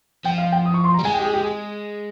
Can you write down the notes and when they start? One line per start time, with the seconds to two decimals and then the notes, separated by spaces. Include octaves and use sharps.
0.25 F3 G5
0.38 F5
0.52 G5
0.65 D#6
0.74 C#6
0.84 C6
0.94 A#5
0.99 G3
1.04 G#3 G#5
1.14 G5
1.19 G4
1.24 G#4
1.34 G4
1.43 G#4